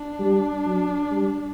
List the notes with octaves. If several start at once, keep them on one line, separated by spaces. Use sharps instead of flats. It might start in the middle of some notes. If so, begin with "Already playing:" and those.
Already playing: D4
G3
F#3
G3